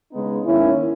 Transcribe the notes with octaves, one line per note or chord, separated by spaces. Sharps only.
C#3 G#3 B3 D#4
G#2 D#3 A#3 C#4 E4